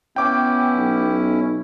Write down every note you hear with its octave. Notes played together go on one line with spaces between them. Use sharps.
B3 C#4 E4 G5 D6
B1